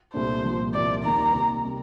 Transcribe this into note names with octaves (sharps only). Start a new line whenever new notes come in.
C2 A#2 A3 D4 C5
C2 A#2 F3
C2 A#2 F3 A#3 D5
D#2 D#3 A#3 A#5
C3 D#3 A#3 D#4 A#4
C3 G3